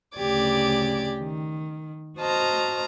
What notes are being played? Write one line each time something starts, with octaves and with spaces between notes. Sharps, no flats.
D2 C#3 G4 D5 D6 G#6
D#3
F#4 C5 D#5 A5 A#5 F6